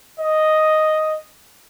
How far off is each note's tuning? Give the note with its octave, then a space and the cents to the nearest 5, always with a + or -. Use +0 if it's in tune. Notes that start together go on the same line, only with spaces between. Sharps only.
D#5 +0